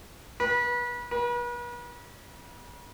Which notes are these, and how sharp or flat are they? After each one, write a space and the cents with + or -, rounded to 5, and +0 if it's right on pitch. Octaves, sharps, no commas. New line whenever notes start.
B4 -30
B4 -40